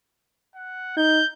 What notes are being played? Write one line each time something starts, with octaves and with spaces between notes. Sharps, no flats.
F#5
D#4 G6